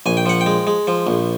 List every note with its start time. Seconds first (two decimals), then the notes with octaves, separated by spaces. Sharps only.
0.06 A#1 G#5
0.17 G5
0.26 F3 F#5
0.41 G5
0.46 G#3
0.67 G#3
0.87 F3
1.07 A#1